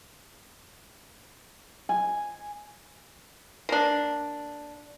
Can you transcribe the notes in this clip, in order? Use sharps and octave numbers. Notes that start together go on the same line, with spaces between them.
G#5
A#3 D4